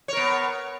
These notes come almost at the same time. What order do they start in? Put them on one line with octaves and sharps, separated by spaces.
C#5 A#4 B3